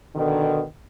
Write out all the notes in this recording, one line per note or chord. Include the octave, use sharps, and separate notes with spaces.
B2 D3 D#3